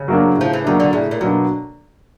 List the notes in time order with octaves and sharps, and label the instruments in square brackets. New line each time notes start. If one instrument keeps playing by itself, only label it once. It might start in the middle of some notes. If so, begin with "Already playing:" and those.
Already playing: [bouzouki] C#3
[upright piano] F#3 A#3 D4
[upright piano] A2 [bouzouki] F3
[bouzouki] E3
[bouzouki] D#3 [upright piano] F#3 A#3 D4
[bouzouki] D3
[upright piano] A2 [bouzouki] C#3
[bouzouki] A#2
[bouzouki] B2 [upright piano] F#3 A#3 D4